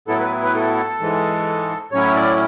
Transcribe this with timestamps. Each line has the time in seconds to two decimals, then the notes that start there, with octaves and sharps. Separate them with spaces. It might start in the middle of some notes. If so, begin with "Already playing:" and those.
0.08 A2 F#3 B3 E4 A4
0.20 B4
0.43 B4
0.54 A4
0.99 G#2 E3 G#3
1.92 A2 F#3 C#4 E4 C#5
2.15 D5